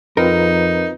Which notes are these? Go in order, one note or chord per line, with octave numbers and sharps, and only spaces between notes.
F2 C4 D#4 F4 A#4 B4